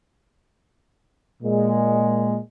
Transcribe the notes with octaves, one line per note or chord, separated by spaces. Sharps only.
A#2 G#3